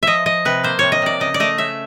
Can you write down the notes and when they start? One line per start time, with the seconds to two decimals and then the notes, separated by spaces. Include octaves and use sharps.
0.03 F3 D#5 E5
0.26 F3 D#5
0.45 C3 B4
0.64 A#3 C5
0.79 C3 C#5
0.92 D#5
1.02 C3 D5
1.20 C#3 D#5
1.34 D5
1.40 A3 D#5
1.58 C#3 E5